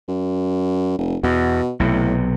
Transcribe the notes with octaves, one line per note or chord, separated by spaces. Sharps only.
F#2
F1
E2 B2
B1 A2 C3